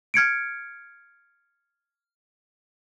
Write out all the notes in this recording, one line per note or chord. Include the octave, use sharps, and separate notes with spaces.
F6 G#6 C#7 D7